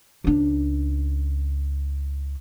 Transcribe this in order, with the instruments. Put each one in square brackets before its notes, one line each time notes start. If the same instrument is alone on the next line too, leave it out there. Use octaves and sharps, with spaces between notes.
[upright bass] C#2 D4